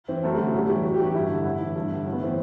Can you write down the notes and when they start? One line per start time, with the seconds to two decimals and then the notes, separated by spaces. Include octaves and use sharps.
0.08 E3 C4
0.23 F#2 A3
0.34 G3
0.38 D3 F#3
0.54 A2 G3
0.69 E3 G3
0.84 F#2 F#4
0.94 G4
1.00 E3 F#4
1.14 G2 E4
1.30 D3
1.45 A2 E4
1.60 E3
1.76 G2
1.91 D3
2.06 A2
2.12 B3
2.20 E3 C4